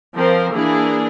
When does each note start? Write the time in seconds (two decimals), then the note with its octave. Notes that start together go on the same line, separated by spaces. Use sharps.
0.14 F3 C4 A#4 C5
0.52 E3 A#3 D4 G#4